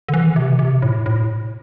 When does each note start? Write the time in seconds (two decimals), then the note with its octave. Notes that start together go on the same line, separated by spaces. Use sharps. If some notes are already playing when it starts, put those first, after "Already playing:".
0.09 D3
0.14 E3
0.31 D3
0.36 C3
0.59 C3
0.82 A2
1.06 A2